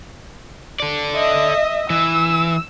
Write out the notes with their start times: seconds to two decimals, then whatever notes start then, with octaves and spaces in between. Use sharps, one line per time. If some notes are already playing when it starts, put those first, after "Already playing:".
0.80 A4 D5
1.16 D#5 E5
1.90 E3 E6